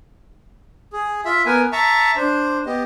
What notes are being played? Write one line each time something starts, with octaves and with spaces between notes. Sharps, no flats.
G#4
F4 E5
B3 A#4 B4 G#5
E5 A5 A#5 C#6
D4 C5
B3 G4 D#5